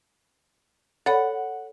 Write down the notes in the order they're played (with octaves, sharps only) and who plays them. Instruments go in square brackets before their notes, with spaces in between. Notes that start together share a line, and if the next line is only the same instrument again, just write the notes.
[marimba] A4 C#5 B5 [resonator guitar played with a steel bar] F#5